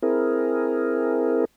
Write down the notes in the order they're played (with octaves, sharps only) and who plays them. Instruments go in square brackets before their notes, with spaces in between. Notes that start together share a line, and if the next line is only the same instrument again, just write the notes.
[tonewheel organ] C4 E4 G#4 A#4